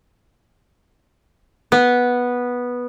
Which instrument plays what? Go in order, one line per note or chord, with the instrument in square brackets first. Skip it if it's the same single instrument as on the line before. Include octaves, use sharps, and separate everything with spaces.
[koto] B3